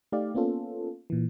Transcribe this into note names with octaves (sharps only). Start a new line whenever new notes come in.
A3 D#4 G4 D5 F5
A#3 B3 C#4 F4 A4
A#2 E3